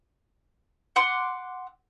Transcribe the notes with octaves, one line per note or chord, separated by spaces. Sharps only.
F#5 C6 D6